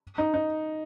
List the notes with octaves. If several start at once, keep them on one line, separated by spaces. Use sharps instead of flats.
D#4
D#4